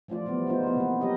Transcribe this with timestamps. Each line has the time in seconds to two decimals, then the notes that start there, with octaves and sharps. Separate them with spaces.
0.08 E3 F3 A3 F4 D5
0.26 E3 F3 G3 B3
0.47 G#3 B3 D#4 F4 C5
0.63 E3 B3
0.76 C3 A#3
1.01 F#3 G4 A#4 D#5